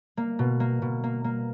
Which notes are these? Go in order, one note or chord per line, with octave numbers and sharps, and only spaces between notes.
A#3
B2
A#3
B2
A#3
A#3